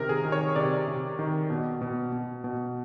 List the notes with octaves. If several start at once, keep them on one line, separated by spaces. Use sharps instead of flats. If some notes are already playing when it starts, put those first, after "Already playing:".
Already playing: C3 D#3 A#4
G#4
D#3
C#5
C3 D5
C3
D#3
B2
B2
B2
B2